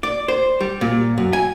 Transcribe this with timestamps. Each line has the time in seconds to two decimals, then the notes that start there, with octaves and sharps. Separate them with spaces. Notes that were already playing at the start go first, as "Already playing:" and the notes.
0.03 D5
0.28 C5
0.61 G3
0.81 A#2
1.18 F#2
1.33 G#5